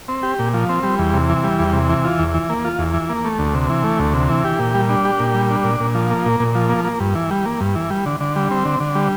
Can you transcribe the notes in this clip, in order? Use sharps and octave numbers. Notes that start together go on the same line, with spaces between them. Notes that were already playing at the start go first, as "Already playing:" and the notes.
C4
G4
A#2
F3
C4
G3
E2
C3
E3
G3
E2
C3
E3
F4
E2
E3
A#3
F4
E2
E3
A#3
A3
D2
C3
E3
A3
D2
C3
E3
G4
A#2
G3
D4
G4
A#2
G3
D4
A#2
A#2
F3
A#3
A#2
A#2
F3
A#3
A#3
G2
E3
G3
A#3
G2
E3
G3
D3
D3
G3
C4
D3
D3
G3